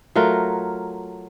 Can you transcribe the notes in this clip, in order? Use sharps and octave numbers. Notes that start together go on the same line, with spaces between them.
F#3 A3 F4 A#4